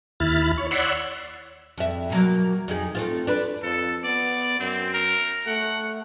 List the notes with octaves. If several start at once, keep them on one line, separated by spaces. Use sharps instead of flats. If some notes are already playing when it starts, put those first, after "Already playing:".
D#2 E4 B5 F6 A6
C#5
C#5 D5 F#5 B5 C6 E6
F2 E5
B2 F#3 A#3
F2 D#4 G#4
A3 C4 F4
D4 B4
F2 A4
B3 D5
F#2 C4
A#4
A3 F#5